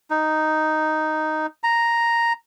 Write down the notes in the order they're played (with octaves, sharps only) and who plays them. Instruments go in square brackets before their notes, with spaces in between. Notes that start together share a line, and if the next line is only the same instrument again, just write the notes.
[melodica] D#4
A#5